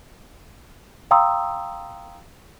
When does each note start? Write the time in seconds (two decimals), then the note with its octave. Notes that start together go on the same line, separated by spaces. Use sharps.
1.11 F5 G5 A#5 C6 D#6 E6